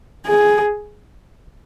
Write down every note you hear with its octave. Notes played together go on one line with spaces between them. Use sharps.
G#4